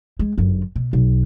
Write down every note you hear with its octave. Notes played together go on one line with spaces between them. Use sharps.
G#3
G1 F#2
B2
B1